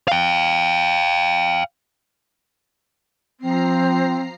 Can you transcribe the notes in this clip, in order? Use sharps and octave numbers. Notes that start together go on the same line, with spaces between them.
F5 G5
F3 C4 A#5 C7